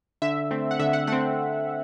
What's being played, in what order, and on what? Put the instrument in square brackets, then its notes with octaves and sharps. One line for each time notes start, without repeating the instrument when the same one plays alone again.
[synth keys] D3 [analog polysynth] E5
[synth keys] A3 C4
[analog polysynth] F#5
[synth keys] D3 [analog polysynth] E5
[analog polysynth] F#5
[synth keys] A3 C4 [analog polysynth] F#5